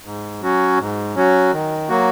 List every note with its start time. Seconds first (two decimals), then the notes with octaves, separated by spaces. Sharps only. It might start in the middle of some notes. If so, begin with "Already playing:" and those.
0.04 G#2
0.41 F#3 C#4 F#4
0.78 G#2
1.15 F#3 C#4 F#4
1.52 D#3
1.89 F#3 A#3 F#4